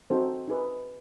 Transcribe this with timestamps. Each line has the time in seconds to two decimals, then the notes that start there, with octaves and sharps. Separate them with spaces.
0.10 C4 D#4 F#4 A4 C5
0.48 D#4 G#4 B4